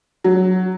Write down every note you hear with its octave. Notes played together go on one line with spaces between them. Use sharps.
F#3